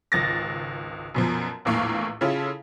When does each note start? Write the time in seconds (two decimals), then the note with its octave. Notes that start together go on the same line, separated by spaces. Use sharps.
0.12 G#1 C#2 A6 A#6
1.15 F#2 B2 F3
1.65 A#1 E2 A2 A#3 F5 C#6
2.21 C#3 C#4 E4 F4 A4